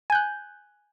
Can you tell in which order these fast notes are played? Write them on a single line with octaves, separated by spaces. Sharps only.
G#5 G6 F#6